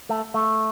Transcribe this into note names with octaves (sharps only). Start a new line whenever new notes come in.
A3
A3